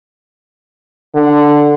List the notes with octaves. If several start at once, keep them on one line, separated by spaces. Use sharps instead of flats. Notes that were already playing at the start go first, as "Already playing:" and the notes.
D3